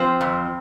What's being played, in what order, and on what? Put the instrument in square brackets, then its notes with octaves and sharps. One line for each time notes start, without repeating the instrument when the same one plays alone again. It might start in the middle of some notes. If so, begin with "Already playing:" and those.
Already playing: [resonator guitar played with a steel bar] F3 C4
F2